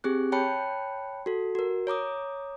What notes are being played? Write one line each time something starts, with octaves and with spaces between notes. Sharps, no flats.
C4 G4 G#4 F#6
C#5 G5 A5 B5 F#6 C#7
F#4 A4
F#4 A#4
C#5 A#5 D6 D#6